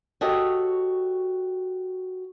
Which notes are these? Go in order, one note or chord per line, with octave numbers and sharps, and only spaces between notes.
F#4 G4 A4 C#5 D#5